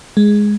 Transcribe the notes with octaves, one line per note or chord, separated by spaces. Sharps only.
G#3